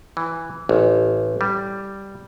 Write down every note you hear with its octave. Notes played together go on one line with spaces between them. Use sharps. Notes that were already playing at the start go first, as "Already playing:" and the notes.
E3
A1
G3